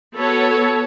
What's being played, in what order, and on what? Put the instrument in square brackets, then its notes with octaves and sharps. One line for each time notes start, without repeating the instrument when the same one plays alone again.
[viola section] B3 F#4 A4 C#5